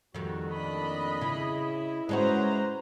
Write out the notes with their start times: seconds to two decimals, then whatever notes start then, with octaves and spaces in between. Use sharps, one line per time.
0.14 F2 D#3 G3 A#3 F#4
0.52 A2 A#3 D4 D#5 B5
1.21 C#3 E4
2.09 G#3 C#4 F#4 B4 C5 A#5